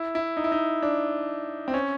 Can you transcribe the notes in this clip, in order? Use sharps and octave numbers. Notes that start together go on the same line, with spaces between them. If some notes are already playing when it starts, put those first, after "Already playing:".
Already playing: E4
E4
D#4
E4
D#4
D4
C4
C#4